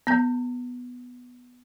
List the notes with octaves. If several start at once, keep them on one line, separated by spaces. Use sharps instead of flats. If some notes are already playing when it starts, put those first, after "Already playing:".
B3 A#5 G6